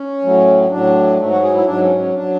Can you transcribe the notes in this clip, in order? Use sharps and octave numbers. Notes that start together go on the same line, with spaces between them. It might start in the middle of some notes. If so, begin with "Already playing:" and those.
Already playing: C#4
A2 F#3
A2 F#3 D4
G#2 F#3 A3
F#4
G#4
E4
G#2 F#3 D4
C#4
C#4
F#3 D4